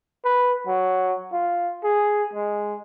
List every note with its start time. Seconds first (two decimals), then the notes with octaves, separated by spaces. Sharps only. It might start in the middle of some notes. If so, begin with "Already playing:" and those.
0.25 B4
0.67 F#3
1.33 F4
1.84 G#4
2.33 G#3